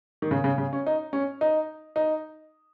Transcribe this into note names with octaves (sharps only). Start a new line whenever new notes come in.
D#3
C#3
C#3
C#3
C#4
D#4
C#4
D#4
D#4